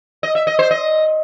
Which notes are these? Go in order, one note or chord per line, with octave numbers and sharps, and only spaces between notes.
D#5
E5
D#5
C5
D#5